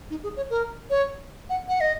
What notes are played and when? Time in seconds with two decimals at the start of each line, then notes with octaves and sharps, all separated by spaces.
0.10 D#4
0.23 G#4
0.36 C#5
0.50 A#4
0.90 C#5
1.50 F#5
1.69 F#5
1.81 D#5